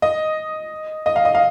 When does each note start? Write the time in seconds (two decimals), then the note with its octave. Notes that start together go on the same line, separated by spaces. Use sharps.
0.02 D#5
1.06 D#5
1.16 F5
1.25 D#5
1.35 F5